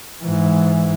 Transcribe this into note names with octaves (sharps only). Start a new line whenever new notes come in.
G#2 E3